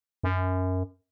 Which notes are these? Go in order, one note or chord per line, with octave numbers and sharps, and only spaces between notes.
F#2